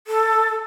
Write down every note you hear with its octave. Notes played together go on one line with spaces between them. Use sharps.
A4